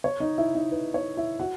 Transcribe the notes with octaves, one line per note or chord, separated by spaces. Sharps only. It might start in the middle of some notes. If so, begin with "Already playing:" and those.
C#5
D#4 D#5
E4 E5
D#4 D#5
B4
C#5
E4 E5
F#4 F#5